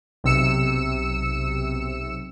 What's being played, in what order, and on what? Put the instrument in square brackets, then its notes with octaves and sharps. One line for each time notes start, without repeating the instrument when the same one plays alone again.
[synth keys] B1 C3 E6 C#7 E7